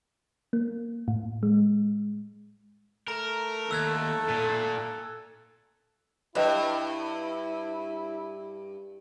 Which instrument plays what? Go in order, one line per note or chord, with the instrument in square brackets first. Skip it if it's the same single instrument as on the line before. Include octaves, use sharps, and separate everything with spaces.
[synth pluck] A#3
A2
G#3
[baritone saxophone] A3 [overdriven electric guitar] A#4 [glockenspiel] A#5
[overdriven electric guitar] D#2 [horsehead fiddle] A4 [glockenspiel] E6 F#6 G#6
[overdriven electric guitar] A#2
[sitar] G2 [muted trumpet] E4 [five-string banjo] B4 D#5 G5